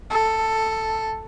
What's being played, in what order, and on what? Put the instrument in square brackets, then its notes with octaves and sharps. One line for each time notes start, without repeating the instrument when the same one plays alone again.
[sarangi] A4